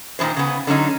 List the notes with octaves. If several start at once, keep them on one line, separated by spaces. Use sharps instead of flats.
A#2 D#3 F3 G#3 C5
C#3 B3
D3 F#3 C#4 D#4